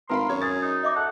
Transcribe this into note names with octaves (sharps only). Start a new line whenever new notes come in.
G#1 A#4 B4 F5 B5 C6
F#2 C#5
G#4 A6
D#4
D#5 E5 D6
A4 F#5